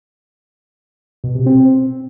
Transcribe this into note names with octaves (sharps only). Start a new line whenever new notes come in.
B2
C3
C4